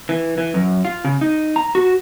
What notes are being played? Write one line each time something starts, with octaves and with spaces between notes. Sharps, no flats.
E3
E3
F#2
F4
C#3
D#4
A#5
F#4